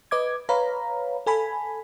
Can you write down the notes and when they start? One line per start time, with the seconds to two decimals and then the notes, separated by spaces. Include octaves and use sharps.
0.11 B4 D#5 D6 G#6
0.49 B4 C#5 F5 A#5 B5
1.27 A4 G#5 B5